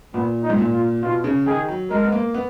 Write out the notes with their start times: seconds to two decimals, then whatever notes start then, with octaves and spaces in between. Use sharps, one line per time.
0.14 A#2 B3
0.43 D#4
0.50 G#2
0.58 A#2
0.73 F4
1.02 B2 F4
1.24 C#3
1.46 D#3 G#4
1.68 F#3
1.90 G#3 A#4
2.04 B3
2.12 A#3
2.34 B3